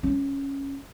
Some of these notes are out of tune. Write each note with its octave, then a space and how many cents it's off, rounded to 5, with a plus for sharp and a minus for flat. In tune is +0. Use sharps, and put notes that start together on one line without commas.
C#4 -5